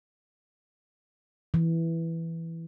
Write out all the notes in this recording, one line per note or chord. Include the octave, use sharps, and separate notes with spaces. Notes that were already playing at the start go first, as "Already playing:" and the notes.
E3